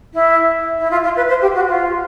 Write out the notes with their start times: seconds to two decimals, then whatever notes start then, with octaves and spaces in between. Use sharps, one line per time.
0.13 E4
0.78 E4
0.91 F4
1.03 F4
1.16 B4
1.28 C5
1.41 G4
1.55 F#4
1.68 F4